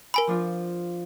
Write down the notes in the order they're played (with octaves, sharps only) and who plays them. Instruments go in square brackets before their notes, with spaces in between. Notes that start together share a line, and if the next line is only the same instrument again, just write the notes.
[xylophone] A#4 G#5 B5
[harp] F3 D4 F4